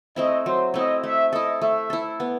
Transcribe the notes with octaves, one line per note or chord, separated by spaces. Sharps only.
A3 C4 E4 D#5
F#3 C5
A3 C4 E4 D#5
A3 E5
E4 A4 D#5
A3 E5
E4 A4
B3